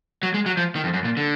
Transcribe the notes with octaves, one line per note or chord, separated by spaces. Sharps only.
F#3
G#3
F#3
F3
D#3
F2
F#2
A#2
D3